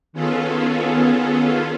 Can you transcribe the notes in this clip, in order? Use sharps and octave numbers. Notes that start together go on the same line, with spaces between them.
D#3 B3 C#4 F4 G#4 A4